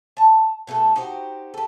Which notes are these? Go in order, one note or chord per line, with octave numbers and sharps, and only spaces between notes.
A5 A#5
B2 A3 D#4 A4
D#4 F#4 G4 C5
G4 A4